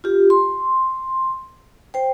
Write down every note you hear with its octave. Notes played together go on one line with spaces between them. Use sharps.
F4 G4
C6
C5 G5